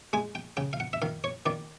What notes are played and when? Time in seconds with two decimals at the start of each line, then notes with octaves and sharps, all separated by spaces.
0.13 G#3 G#5
0.35 G5
0.57 C#3 G5
0.73 F5
0.80 F#5
0.93 E5
1.02 D#3 F5
1.24 C#5
1.46 D#3 D5